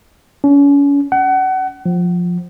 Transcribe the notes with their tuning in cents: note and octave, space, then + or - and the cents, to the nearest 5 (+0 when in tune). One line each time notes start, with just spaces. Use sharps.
C#4 +35
F#5 +30
F3 +15